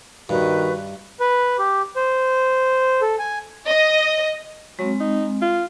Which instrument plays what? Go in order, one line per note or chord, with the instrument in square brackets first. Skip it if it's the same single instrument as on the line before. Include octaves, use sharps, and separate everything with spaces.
[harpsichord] G2 [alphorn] D#3 [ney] F#4 [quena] B4
[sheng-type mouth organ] B4
G4
C5
A4
G#5
[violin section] D#5
[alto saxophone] F#3 [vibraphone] G#3 C4
[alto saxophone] D#4
F4